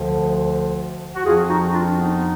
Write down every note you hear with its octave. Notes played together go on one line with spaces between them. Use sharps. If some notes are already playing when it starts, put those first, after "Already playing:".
Already playing: D2 D3 F3
F#4
F2 F3 F4 G#4
D#4 F#4
D4 F4
B3 D#4